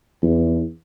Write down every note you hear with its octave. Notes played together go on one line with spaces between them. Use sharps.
E2